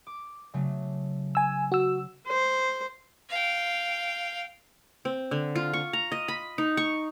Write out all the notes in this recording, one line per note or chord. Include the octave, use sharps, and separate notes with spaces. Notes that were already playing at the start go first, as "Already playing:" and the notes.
D6
C#3 F#3 A3
G#5 E6
F#4 E6
C5
F5 G5
C4
D3
F4
C#6
A#5
D#5
B5
D#4
C#6